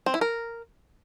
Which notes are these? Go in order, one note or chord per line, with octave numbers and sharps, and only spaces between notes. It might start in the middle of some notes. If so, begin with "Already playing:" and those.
C4
E4
A#4